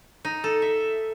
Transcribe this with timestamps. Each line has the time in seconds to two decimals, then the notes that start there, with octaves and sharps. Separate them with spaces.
0.25 D#4
0.44 A4
0.62 E5